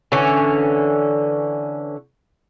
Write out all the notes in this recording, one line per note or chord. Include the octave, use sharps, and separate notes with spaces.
D3 E3 C#4